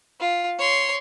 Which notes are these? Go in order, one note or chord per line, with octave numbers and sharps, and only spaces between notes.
F4
C#5 C6